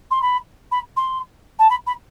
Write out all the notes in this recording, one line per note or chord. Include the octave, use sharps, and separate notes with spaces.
C6
B5
B5
C6
A5
B5
B5